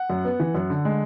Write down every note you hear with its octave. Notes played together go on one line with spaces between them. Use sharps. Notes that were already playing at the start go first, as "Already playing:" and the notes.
Already playing: F#5
F#2
B3
E3
F#2
D3
G#3